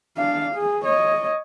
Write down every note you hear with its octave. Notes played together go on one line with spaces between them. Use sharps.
D4 F5
G#4
C#5 D#5